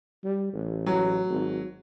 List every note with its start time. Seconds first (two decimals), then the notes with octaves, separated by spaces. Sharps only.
0.24 G3
0.53 A1
0.86 F#3
1.29 G#1